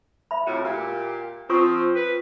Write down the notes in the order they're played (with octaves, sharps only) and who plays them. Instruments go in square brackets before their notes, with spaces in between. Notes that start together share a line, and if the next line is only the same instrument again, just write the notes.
[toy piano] E5 B5
[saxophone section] F2 A2 F#4
[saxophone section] A#2 A#3 G4 [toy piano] E6
[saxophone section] F3 C4 [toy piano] F4 C#6 D#6
[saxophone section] B4